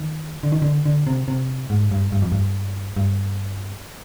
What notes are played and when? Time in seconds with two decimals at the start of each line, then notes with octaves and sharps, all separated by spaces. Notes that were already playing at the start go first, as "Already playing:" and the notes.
Already playing: D#3
0.43 D3
0.52 D#3
0.62 D3
0.86 D3
1.07 C3
1.28 C3
1.70 G#2
1.92 G2
2.12 G2
2.22 F2
2.32 G2
2.97 G2